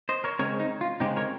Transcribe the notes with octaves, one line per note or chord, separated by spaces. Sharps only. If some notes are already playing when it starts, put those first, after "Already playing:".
C5 D#5
A#4 C#5
C#3 G#3 C4 A#4 C#5
D#4
F4
C#3 G#3 C4 D#4 G4
A#4 C#5